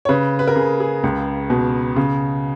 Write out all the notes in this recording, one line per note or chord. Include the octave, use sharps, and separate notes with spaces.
C#5
C#3 B4
B4
A#4
C#3 G#4
G#4
C#2
B2
C#3